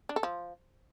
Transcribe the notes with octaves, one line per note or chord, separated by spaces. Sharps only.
D4
A4
F3